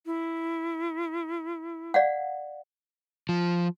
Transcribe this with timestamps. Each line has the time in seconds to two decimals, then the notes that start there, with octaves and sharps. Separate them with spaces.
0.06 E4
1.94 D5 F5 F#5
3.29 F3